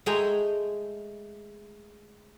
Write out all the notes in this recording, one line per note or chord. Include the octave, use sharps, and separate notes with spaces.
G#3 A3 G5 G#5 A#5